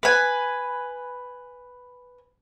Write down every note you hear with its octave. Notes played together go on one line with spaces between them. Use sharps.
B4 G#5